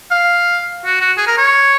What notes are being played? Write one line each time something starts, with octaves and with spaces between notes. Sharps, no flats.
F5
F#4
F#4
G#4
A#4
C#5